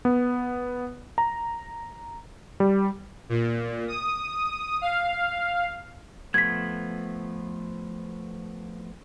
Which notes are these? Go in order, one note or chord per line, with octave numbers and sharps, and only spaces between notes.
B3
A#5
G3
A#2
D#6
F5
F3 A3 B3 G#6 B6